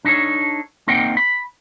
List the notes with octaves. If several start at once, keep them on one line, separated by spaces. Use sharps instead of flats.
D4 D#4 G4 A4 C#5
A#3 C4 D#4 D#5 F#5 G5
B5